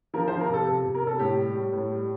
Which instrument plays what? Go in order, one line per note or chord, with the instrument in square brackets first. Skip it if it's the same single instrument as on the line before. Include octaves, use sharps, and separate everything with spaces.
[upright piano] F3 A#4
C5
F3
A#4
C3 A4
C3
C3
A#4
C3
A4
A2 G4
G3
G3
A2
G3